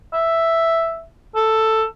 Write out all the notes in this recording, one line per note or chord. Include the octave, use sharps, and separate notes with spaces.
E5
A4